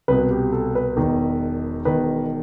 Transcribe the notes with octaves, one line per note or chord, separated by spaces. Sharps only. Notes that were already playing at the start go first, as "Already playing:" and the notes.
C2 B2 B4
G4
A4
B4
E1 E2 D#3
E1 E2 D#3 B4